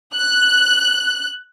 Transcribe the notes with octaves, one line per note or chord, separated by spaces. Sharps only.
F#6